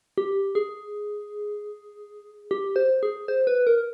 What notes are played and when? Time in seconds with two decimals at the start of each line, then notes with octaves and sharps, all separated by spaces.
0.18 G4
0.55 G#4
2.51 G4
2.76 C5
3.03 G#4
3.28 C5
3.47 B4
3.67 A#4